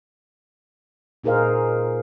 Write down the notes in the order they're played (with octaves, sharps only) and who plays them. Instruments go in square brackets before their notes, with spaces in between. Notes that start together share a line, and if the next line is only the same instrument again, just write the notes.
[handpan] A#2 D#4 G#4 A#4 C5 F5